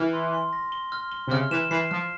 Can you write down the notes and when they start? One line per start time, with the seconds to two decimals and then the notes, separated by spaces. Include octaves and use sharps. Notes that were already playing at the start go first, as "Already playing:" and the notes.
Already playing: E3 F6
0.13 C6
0.33 C6
0.53 A#6
0.72 G7
0.92 F6
1.12 G7
1.27 C3
1.31 C#3 F6
1.51 E3 E7
1.71 E3 C7
1.91 F3 F6